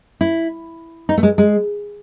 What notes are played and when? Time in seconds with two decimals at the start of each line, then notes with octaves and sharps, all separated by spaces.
0.21 E4
1.09 D#4
1.18 A3
1.23 G#3
1.38 G#3